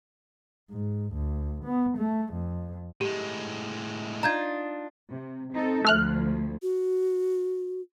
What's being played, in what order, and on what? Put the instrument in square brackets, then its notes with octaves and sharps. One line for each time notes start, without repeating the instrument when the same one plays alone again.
[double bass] G#2
D2
B3
A3
F2
[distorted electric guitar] A2 G#3 [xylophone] G4
[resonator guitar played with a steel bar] D4 D#4 F4 [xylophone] A#5 G6 G#6
[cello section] C3
C4 D#4 A4
[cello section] D2 F3 [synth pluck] A3 F6 F#6
[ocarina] F#4